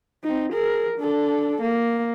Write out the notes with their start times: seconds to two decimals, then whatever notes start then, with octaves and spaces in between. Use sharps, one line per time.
0.24 C4 D#4
0.53 G#4 A#4
0.98 D4 A4
1.62 A#3